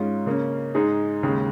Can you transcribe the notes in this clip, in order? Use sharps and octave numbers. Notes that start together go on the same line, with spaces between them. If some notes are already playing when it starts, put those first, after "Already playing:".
Already playing: G#2 G#3 C#4 F4
C#3 A#3 C#4
G#2 G#3 D#4 G#4
D#2 C#3 G#3